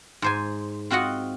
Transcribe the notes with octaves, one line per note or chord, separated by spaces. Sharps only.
G#2 C5 G#5
C4 F4 F#4 D#5 F#5